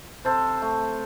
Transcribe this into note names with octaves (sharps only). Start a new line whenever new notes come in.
C3 A4 C5
A3